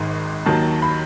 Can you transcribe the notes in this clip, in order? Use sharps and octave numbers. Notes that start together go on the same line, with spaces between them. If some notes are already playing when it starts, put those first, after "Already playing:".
Already playing: G#1 G#2 D#3 G#3
D#2 D#3 F#3 A5
B5